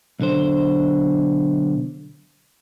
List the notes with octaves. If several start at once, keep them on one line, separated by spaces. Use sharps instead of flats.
B1 D3 C5